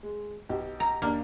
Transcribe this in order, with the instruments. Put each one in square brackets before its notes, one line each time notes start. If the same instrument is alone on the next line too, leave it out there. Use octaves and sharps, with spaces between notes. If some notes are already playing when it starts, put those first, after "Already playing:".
[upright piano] G#3
B1 G4
[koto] A#5
[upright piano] D#2 D4 [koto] A#3